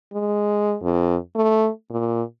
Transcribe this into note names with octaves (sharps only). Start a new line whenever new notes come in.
G#3
F2
A3
A#2